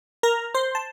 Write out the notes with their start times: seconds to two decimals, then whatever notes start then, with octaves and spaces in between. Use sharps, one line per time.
0.23 A#4 A#5
0.55 C5 C6
0.75 A5